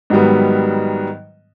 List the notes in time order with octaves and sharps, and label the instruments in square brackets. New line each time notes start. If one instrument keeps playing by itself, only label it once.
[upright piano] G#2 D#3 F#3 G3 B3